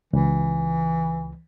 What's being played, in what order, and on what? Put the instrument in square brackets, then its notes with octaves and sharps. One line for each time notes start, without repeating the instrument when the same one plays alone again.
[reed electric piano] C#2 [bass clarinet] E3